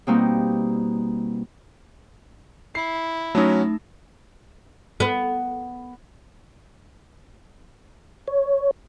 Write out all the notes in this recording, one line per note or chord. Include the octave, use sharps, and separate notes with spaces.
B2 G3 A#3 C4 D#4 F#4
E4 C7
F#3 A3 C#4 D#4
B3
C#5